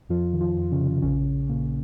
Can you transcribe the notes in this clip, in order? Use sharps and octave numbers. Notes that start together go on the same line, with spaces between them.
F2 F3 F4
D#3
F3 F4
F2
C#3 C#4
C3
A#1 C#3 C#4
A#1
A#2 A#3